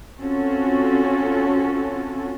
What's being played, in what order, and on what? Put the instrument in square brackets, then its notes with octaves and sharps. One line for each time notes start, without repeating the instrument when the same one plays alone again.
[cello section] C4 C#4 F4 F#4 A4